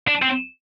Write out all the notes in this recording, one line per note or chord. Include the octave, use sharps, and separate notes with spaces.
D4
C4